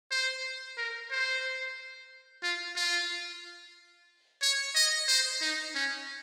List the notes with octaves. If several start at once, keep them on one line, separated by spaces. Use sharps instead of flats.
C5
A#4
C5
F4
F4
C#5
D#5
C5
D#4
C#4